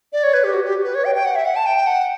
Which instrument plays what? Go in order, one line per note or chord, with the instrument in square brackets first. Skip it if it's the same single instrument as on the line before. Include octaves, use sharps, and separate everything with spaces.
[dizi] D5
C#5
B4
G4
F#4
G4
B4
C#5
G5
G5
F#5
E5
F#5
A5
G5
F#5